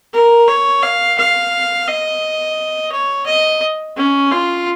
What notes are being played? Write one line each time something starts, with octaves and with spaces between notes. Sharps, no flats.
A#4
C#5
F5
F5
D#5
C#5
D#5
C#4
F4